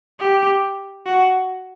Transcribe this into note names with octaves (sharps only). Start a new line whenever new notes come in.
G4
F#4